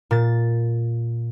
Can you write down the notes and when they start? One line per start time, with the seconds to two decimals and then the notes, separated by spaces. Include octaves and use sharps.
0.11 A#2 A6